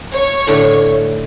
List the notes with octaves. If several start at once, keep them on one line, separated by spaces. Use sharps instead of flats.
C#5
A2 D3 A3